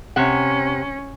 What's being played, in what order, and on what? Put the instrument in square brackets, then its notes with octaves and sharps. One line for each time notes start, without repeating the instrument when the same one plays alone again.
[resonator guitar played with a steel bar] C3 F#5 [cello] C#4